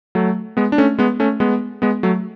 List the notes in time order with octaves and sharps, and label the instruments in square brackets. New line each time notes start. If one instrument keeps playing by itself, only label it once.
[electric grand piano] F#3 A3
G#3 B3
D4
A3 C#4
G#3 B3
A3 C#4
G#3 B3
G#3 B3
F#3 A3